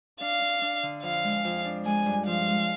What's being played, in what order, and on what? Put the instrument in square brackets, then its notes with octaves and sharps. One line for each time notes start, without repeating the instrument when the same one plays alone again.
[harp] D4 [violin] F5
[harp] D4
D4
D3
[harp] F2 [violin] F5
[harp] G#3
F2
D4
[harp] G#3 [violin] G#5
[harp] G2
[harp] F3 [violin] F5
[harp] G#3